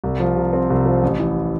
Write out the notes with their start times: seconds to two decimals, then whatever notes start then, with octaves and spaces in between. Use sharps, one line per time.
0.04 C2
0.20 F3
0.37 C3
0.53 C4
0.70 C2
0.86 F3
1.03 A1
1.19 E3